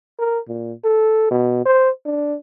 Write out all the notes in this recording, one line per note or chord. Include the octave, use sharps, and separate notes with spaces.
A#4
A#2
A4
B2
C5
D4